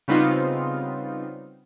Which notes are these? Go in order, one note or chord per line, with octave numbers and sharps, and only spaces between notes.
C#3 G3 B3 C4 D#4 F4